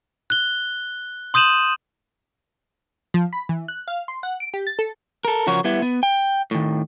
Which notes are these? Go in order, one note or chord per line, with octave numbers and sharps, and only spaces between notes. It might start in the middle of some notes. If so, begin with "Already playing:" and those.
F#6 G7
C6 D#6 G6 D#7 E7 F#7
F3
B5
E3
F#6
F5
C6
F#5
D7
G4
A6
A4
A4 A#4
C#3 F3 F#4 A#4 C#5
G3 B3 E4
B3
G5
A2 D#3